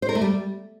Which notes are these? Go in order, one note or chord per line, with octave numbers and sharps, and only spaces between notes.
C5
A#4
A3
G3